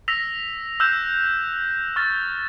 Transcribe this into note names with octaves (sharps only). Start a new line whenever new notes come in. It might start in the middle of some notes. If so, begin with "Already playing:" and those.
E6 A#6 B6 F7
E6 F#6 G6 E7
C#6 F6 A6